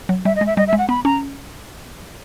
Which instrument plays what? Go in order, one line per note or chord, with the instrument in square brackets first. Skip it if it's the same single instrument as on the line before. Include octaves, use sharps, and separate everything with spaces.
[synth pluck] F#3
[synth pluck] G3 [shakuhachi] E5
[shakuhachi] D#5
[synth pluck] G#3
[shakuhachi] E5
[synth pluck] G3 [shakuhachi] D#5
[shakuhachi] E5
[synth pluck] G#3
[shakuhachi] F#5
[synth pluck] B3 [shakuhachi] B5
[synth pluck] C#4 [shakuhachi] A#5